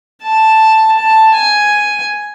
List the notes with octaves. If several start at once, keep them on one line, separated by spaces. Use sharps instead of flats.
A5
A5
G#5